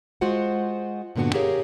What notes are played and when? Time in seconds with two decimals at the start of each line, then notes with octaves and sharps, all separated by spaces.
0.21 G#3 F4 F#4 C5 F#5
1.16 G2 A#2 D3 B3 F#4
1.34 G4 G#4 A#4 C#5 F5